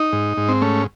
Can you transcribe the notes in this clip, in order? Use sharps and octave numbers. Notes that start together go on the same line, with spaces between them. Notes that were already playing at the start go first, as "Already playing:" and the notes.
Already playing: D#4
G#2
G#2
C4
A3 C#4